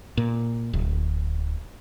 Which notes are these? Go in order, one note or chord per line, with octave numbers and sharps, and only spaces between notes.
A#2
D1